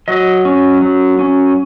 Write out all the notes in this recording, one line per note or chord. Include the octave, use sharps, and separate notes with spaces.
F#3 D#5
C#4
F#3
C#4